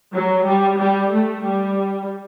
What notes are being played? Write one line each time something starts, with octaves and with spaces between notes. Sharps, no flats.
F#3
G3
G3
A3
G3